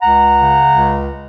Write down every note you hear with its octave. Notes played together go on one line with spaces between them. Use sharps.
C#2 F#5 A#5
C#3
C#2